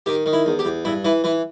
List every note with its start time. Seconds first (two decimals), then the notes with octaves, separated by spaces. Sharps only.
0.06 D#3 G4
0.26 D#3
0.33 E4
0.46 E2
0.59 G4
0.65 E2
0.85 G2 E4
1.05 E3 E4
1.24 E3 E4